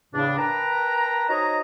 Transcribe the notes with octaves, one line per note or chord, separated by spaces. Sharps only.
E2 A2 C#3 D4
A#4 B4 G5 A5 A#5
D#4 F#4 C5 C#5 D#5 A#5